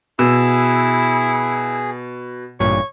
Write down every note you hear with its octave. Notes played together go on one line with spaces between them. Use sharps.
B2 E4 G#4 E6
A1 G2 A#2 C#5